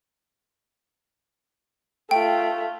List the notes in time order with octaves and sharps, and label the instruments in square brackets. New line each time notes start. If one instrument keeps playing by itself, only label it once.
[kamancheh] A3 F4 [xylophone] G5